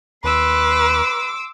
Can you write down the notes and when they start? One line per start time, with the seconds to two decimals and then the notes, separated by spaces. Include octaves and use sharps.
0.24 D#2 B4 C6 D6 E6